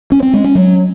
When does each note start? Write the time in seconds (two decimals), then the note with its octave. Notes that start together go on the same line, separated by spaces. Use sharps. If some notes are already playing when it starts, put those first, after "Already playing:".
0.12 C#4
0.23 C4
0.33 G#3
0.44 C#4
0.55 F#3